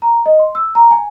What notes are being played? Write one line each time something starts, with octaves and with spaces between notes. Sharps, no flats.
A#5
D#5
C6
E6
A#5
G#5